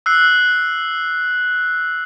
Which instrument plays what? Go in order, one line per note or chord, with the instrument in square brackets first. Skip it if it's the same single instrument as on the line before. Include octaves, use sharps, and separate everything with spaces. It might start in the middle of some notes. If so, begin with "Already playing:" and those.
[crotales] E6 F#6 C7